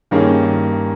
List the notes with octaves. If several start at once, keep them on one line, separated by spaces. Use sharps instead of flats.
G2 D#3 A#3 C#4 G#4